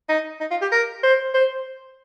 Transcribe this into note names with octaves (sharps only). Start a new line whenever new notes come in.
D#4
D#4
F4
G4
A#4
C5
C5